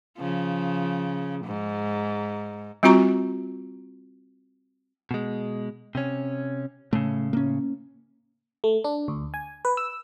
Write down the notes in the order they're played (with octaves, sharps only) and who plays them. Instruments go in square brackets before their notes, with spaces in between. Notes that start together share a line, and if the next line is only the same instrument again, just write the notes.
[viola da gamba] C#3 F3
G#2
[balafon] G3 C4 F4 F#4 A#5 C#6
[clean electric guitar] B2 G#3
C3 C#4
[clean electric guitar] A2 C#3 [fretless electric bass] A3
[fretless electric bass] A#3 C#4
[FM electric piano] A3
D4
D2
G#5
B4
E6